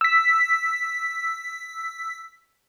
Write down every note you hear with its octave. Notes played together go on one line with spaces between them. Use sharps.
E6 B6